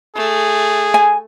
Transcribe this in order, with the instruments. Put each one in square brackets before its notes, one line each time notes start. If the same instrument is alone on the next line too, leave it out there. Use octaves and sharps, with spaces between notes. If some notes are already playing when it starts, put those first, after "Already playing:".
[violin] A3 [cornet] G#4
[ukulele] G#5